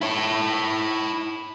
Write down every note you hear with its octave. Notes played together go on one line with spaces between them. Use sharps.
E4 C#5